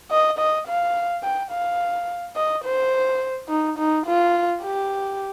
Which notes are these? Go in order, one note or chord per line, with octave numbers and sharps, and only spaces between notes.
D#5
D#5
F5
G5
F5
D#5
C5
D#4
D#4
F4
G4